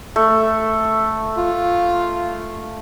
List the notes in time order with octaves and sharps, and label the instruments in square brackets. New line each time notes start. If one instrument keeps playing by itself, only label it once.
[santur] A3
[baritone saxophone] F4